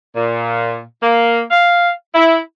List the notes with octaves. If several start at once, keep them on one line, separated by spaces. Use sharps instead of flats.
A#2
A#3
F5
E4